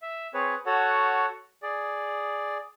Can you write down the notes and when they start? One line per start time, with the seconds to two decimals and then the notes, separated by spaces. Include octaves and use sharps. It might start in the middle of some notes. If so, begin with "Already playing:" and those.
0.02 E5
0.34 C4 G#4 B4 C#5
0.66 F#4 A4 C#5 F#5
1.63 G#4 D5